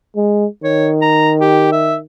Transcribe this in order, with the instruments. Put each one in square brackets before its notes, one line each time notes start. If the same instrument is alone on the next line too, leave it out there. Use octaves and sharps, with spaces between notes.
[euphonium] G#3
[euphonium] D#3 [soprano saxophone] C#5
[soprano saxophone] A#5
G4
E5